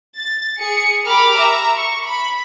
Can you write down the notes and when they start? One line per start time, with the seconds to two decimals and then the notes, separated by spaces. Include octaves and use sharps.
0.18 A6
0.59 G#4 C#7
1.07 G4 A#4 B5 D6 F6
1.37 E5 A#5
1.75 C#6
2.05 B5